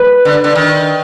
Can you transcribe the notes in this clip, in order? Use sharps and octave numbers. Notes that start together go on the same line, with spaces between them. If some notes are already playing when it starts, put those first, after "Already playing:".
Already playing: B4
D3
D3
D#3